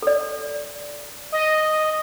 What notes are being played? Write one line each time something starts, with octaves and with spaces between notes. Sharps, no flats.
A4 D5
D#5